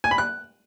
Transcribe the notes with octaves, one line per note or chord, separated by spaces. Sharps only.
G#5
B5
F#6